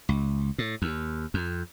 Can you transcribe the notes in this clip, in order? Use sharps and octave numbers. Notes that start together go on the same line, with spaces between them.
C#2
A2
D#2
F2